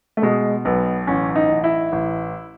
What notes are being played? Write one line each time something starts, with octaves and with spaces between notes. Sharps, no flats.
A3
B2 G#3
B1 B3
A1 C#4
D#4
A1
E4
A1